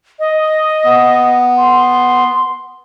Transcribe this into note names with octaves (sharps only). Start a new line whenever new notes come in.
D#5
B3
C6